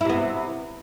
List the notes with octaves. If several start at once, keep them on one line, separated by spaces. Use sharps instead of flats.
C3 B3 E4